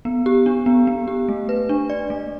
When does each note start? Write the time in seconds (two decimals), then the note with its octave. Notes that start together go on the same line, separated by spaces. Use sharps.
0.05 B3
0.26 G4
0.46 D4
0.66 B3
0.87 B3
1.08 G4
1.29 A3
1.49 B4
1.69 D4
1.90 D5
2.10 A3